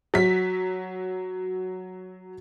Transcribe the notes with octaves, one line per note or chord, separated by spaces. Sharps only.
F#3 B6